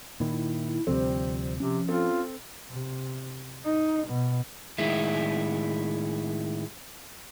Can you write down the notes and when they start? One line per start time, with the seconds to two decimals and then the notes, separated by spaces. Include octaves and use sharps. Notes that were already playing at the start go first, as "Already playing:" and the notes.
0.20 A#2 D#3 E4
0.87 D2 C3 F3 G3 C4 C5
1.60 C3 F3 C#4
1.88 C4 F4 A4
2.69 C3
3.65 D#4
4.08 B2
4.78 A2 D#3 G#3 E4